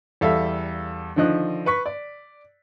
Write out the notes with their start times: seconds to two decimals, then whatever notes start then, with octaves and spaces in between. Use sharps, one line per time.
0.21 E2 G3 A4 E5 F5
1.16 D3 D#3 F3 D#5 F#6
1.66 B4 C#6 B6
1.86 D5